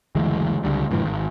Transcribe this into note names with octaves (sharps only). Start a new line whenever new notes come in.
F#1 D2 E3 G#3
C#2 D3 G3
F#2 A2 D3 E3
G#1